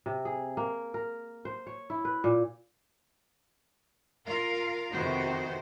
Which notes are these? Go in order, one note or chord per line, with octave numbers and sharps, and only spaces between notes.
C3
G#4
A#3
A#4
C5
C#5
E4
B4
A#2
F4 A#4 F5
F2 C3 D#3 B3 F#4 C5